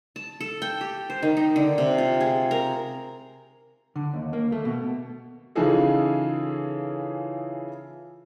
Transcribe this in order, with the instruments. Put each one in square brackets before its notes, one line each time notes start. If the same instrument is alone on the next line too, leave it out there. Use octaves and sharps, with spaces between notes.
[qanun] A5
A4
G5
G4
C5
D#3
D#4
D3
C3
F4
G#4
A#4
[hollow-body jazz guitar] D3
D#2
A#3
A3
B2
[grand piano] C#3 E3 D#4 F4 G#4 A4